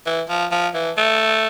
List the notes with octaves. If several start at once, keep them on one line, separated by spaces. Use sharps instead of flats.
E3
F3
F3
E3
A3